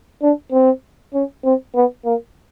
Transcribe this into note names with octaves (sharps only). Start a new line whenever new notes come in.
D4
C4
C#4
C4
B3
A#3